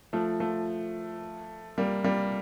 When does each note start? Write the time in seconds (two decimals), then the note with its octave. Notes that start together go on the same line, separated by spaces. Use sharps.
0.13 F3 A3
0.40 F3 A3
1.78 G3 A#3
2.04 G3 A#3